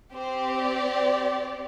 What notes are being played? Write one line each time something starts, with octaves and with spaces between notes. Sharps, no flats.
C4 G4 C5
D5